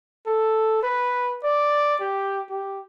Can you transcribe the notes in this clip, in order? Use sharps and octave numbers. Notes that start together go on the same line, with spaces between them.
A4
B4
D5
G4
G4